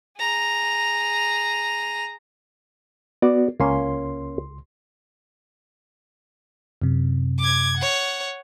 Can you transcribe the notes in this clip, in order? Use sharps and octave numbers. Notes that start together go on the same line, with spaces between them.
G#4 A#5
B3 F#4 D5
C#2 A#3 C#4 C6
F#2 C3
D6 G#6
C#5 F#5